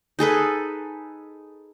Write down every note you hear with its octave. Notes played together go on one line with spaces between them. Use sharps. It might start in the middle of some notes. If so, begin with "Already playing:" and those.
D#4 G#4 A4 B4